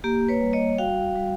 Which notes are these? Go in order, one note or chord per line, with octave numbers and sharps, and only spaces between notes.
A#3 G4
B4 C#5
G3
C#5 D#5
F#4 F5 G5
G3